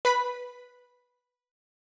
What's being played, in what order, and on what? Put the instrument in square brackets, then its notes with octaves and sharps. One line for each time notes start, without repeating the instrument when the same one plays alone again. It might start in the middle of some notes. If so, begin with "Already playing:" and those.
[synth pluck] B4 B5 B6